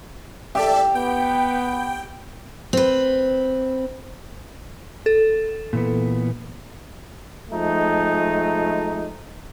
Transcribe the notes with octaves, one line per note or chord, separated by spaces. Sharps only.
G4 A4 D5 E5
B3 G5
C4 B4
A4
A#2 E3 B3
F3 G#3 A3 D#4